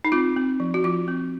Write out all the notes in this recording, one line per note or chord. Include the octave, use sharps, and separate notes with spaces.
D#4
C4 F4
C4
F3
F#4
F3 F4
C4